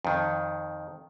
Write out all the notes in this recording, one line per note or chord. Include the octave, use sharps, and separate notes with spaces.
F2 D#3